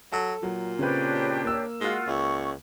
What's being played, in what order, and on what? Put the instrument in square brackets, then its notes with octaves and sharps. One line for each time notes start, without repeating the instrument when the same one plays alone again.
[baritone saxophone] F#3 [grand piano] A4 A5
[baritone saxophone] A#2 [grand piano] F#3
[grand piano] C#3 C4 B4 [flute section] D4 G4 C#5
[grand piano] A#3 E6
[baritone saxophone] G#3 [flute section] F4 F#4
[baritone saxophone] C#2 [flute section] C#6